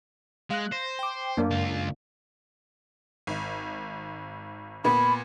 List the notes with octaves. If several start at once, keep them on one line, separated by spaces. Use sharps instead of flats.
G#3 F5 F#6
C5 A#6
G5 D6
F#2 A#3 D4
C#2 F4
G#1
A#2 B3 B5